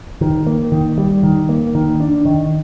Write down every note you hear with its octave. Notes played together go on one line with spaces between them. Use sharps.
D#3
A#3
D#3
G3
D#3
A#3
D#3
D4
D#3